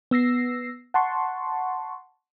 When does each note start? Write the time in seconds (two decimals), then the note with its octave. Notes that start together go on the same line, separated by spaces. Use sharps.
0.11 B3 E6 A#6 C7
0.94 F#5 A5 C6 C#6